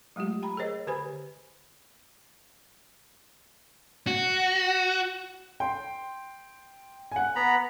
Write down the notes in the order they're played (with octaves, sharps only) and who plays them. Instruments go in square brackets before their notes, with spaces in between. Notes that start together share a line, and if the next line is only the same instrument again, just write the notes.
[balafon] F#3 G#3 A3 F4 G4
G5 A#5 B5
G#4 A#4 C5 C#5 D#5
D3 G4 B4 C5 G#5 B5
[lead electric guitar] F#4
[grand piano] G5 C6
F#5 G#5
[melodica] B3 A#5 B5